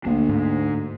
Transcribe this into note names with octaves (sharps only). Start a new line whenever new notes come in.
D2 A#3 D4
G#2